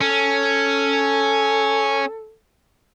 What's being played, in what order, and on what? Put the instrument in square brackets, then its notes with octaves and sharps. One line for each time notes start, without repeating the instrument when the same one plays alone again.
[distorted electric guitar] C#4 [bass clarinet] A4